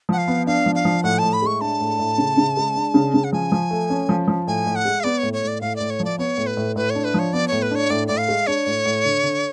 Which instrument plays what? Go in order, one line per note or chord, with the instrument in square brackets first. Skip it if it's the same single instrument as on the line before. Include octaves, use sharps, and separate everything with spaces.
[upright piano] F3 [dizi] F#5
[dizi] F5
[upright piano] B3
[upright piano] D4 [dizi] F5
[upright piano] F3
[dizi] F5
[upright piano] F3
[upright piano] A2 [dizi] F#5
[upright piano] A2 [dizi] A5
[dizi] B5
[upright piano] G#3 [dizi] C#6
[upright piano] D4 [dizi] A5
[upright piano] A2
A2
C#3
C#3
G#3
D4
C#3
C#3
[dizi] F#5
[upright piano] F3 [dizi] G#5
[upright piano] F3
A3
C#4
F3
F3
[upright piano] A2 [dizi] G#5
[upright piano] A2
[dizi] F#5
[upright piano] G#3
[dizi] F5
[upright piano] B3 [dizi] D5
[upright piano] A2 [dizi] C#5
[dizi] C#5
[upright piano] A2
[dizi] D5
[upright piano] A2 [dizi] F5
[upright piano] A2 [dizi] D5
[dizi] C#5
[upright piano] F3 [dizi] D5
[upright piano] B3 [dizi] C#5
[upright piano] A2
[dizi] B4
[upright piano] A2
[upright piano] A2 [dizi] B4
[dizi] C#5
[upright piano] D4
[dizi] B4
[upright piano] F3 [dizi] C#5
[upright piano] B3 [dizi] D5
[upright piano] A2 [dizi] C#5
[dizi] B4
[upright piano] D4 [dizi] C#5
[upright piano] A2 [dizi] D5
[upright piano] A2 [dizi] D5
[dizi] F5
[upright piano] G#3
[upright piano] D4 [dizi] C#5
[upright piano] A2
A2
D3
D3